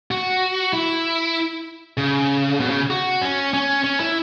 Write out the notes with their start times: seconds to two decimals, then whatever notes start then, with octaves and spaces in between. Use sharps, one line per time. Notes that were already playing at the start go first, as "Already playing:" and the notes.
0.11 F#4
0.73 E4
1.97 C#3
2.60 B2
2.70 C#3
2.90 F#4
3.21 C#4
3.53 C#4
3.84 C#4
4.00 E4